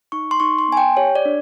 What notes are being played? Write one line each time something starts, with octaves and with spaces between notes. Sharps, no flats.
D#4 C#6
C6
D#4 C#6
C6
B3 G#5
G5
G4 C#5
D5
D4